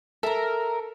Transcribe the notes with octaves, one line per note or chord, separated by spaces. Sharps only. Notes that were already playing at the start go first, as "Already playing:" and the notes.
A4 A#4 E5 A#5